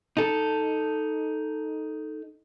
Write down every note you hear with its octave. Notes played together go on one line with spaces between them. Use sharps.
D#4 A4